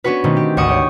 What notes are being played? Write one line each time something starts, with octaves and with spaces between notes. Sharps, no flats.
B3 C#4 D4 F#4 B4
B2 D#3 A3 C4
G4
G#1 D2 F#5 C#6 D#6 E7
G4 C#5